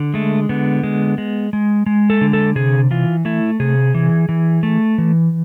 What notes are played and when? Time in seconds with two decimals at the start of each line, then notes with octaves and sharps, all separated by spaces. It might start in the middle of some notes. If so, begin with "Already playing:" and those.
Already playing: D3
0.14 G#3 A3
0.49 D3 B3
0.83 G#3
1.18 G#3
1.53 G#3
1.86 G#3
2.10 A4
2.21 D3
2.33 A4
2.55 C3 G#4
2.91 E3 F4
3.25 A3 E4
3.60 C3 G#4
3.94 E3
4.29 E3
4.63 A3
4.98 E3